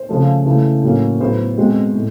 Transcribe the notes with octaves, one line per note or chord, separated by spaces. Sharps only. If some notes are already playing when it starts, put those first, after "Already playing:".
Already playing: C5
C#3 F3 A3
C#3 E3 A3
A2 F#3 A#3 C#4
A2 F#3 B3 C5
B2 G#3 C4
A2